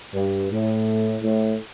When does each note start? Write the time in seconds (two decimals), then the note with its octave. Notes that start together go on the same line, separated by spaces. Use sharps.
0.14 G2
0.50 A2
1.23 A2